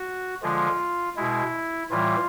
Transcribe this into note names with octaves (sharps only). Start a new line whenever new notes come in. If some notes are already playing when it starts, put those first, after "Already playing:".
Already playing: F#4
D3 F3 G#3 F4
B2 G#3 E4
A2 E3 G3 F4